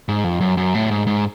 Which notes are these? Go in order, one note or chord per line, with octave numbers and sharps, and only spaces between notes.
G#2
F2
F#2
F#2
A2
G#2
G#2